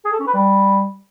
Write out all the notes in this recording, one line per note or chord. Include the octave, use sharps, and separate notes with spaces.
G#4
A4
C#4
B4
G3